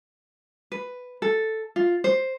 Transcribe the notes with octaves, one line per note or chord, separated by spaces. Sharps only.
B4
A4
F4
C5